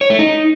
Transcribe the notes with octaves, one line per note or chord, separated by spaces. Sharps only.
C#5
A3
D#4